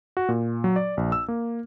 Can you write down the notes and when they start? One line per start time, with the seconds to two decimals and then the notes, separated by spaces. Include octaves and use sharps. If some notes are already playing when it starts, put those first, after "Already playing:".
0.17 F#4
0.29 A#2
0.64 F#3
0.76 D5
0.97 A#1
1.12 E6
1.28 A#3